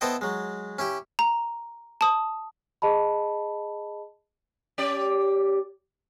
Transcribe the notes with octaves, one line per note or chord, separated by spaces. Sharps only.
B3 E4 A4 C5 D#5 G5
F#3 G#3
C#4 E4 G4
A#5
A5 D#6
G#4 D#5 A5 B5
C#4 G4 D5